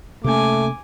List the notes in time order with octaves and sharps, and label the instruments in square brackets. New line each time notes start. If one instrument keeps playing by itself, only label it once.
[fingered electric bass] C3 A#3 C#4 [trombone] A3 [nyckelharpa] G#5 D6